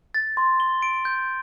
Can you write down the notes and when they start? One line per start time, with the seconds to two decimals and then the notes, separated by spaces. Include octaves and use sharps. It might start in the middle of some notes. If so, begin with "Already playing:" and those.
0.14 A6
0.37 C6
0.60 G7
0.82 D7
1.05 G6